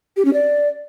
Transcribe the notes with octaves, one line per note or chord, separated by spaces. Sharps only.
G4
C#4
D5